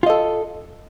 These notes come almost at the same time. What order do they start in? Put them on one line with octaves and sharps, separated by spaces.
F4 D#5 A4